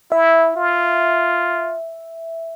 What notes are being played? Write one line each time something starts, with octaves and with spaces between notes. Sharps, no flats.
E4 E5
F4